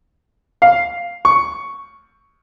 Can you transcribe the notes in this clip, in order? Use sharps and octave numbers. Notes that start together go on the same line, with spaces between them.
F5
C#6